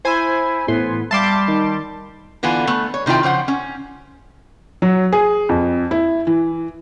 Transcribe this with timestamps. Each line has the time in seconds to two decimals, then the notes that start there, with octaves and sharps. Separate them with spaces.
0.05 E4 C5 G#5
0.68 A2 E3 B3 C6
1.11 G3 E5 F5 A5 C6 D6
1.48 D#3
2.43 D3 E3 B3 F4 G#5
2.67 A3 B3
2.94 C#5
3.06 C3 D#3 E4 F4 G5
3.23 C#3 F3 C5 F#5
3.48 C#4
4.82 F#3
5.13 G#4
5.49 F2
5.91 E4
6.27 E3